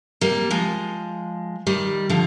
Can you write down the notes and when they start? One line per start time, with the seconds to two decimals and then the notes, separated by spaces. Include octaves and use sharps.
0.21 G3 A#3
0.51 F3 G#3
1.67 D#3 G3
2.10 D3 F3